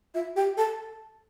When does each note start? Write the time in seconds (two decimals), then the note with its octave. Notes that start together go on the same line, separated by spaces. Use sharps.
0.15 F4 E5
0.36 G4 G5
0.57 A4 A5